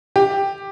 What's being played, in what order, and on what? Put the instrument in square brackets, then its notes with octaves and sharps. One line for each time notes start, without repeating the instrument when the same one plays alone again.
[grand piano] G4